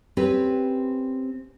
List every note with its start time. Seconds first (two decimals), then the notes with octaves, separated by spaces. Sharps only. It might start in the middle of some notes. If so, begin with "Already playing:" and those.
0.17 C4 C#4 G4 B4